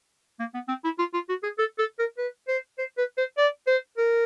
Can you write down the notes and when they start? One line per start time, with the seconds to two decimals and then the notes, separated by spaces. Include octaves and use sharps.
0.40 A#3
0.54 B3
0.68 C4
0.84 E4
0.99 F4
1.14 F4
1.29 F#4
1.43 G#4
1.59 A4
1.79 A4
1.99 A#4
2.18 B4
2.48 C5
2.78 C5
2.98 B4
3.18 C5
3.38 D5
3.67 C5
3.98 A#4